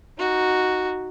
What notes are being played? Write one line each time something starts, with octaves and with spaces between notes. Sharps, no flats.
D#4 F#4